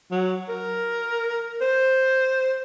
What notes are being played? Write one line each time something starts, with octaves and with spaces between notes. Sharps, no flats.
F#3
A#4
C5